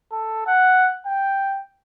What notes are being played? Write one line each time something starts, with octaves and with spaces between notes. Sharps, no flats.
A4
F#5
G5